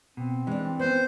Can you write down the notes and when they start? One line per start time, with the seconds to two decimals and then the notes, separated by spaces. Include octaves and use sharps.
0.17 B2 C4
0.47 E3 G#3 D4
0.79 B3 C#4 C5